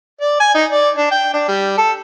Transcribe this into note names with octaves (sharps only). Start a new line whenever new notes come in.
D5
G#5
D#4
D5
D4
G5
D4
G3
A4